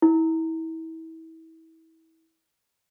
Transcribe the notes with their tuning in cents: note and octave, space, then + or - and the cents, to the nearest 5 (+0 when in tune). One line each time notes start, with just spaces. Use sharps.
E4 -30